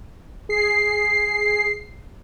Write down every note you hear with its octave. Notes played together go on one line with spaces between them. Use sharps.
G#4 C7